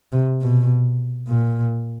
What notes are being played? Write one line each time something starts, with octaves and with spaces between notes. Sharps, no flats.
C3
B2
A#2